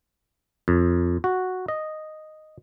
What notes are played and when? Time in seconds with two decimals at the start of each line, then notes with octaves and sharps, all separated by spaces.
0.68 F2
1.24 F#4
1.68 D#5